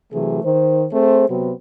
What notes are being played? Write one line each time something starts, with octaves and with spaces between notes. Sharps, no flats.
C3 E3 F#3 A3 G#4
D#3 C5
A3 C4 G#4 C5
C3 F#3 B3 C4 F#4